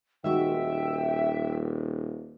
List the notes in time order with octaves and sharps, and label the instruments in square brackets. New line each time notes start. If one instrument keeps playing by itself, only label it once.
[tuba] D#1 [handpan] D#3 G#3 F#4 [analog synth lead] E5 [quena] G5